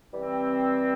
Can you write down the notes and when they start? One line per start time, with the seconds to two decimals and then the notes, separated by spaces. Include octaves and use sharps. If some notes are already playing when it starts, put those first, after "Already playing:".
0.13 E3 G3 C4